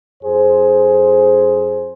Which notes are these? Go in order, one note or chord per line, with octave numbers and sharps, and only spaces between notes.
F2 G#4 C5